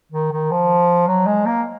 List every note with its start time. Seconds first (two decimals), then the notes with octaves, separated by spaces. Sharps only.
0.12 D#3
0.32 D#3
0.51 F3
1.07 F#3
1.27 G#3
1.46 A#3